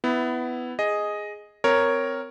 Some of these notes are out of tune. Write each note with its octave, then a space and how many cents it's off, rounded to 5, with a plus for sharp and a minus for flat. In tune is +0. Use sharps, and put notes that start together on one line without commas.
B3 +15 E4 +0
G#4 +0 D#5 +0
C4 -20 A#4 +0 C#5 +0